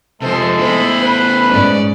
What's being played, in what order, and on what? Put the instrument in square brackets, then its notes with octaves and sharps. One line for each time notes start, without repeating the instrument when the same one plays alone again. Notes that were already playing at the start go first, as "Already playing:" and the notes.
[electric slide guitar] C3 F3 [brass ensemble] G#3 A4 E5 [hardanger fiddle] C5
[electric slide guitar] A3 B3 E4 [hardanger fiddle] C5 B5
[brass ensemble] B4
[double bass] G#2 [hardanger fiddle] C#4 D5